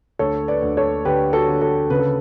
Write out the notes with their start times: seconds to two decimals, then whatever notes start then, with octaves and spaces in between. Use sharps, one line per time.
0.19 D2 A4 C#5
0.48 B4 D5
0.62 D2
0.77 A4 C#5
1.05 D3 G4 B4
1.33 F#4 A4
1.48 D3
1.61 F#4 A4
1.90 C#3 B4
1.99 A4